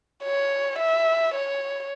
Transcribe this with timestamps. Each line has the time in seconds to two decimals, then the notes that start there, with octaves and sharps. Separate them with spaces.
0.24 C#5
0.79 E5
1.34 C#5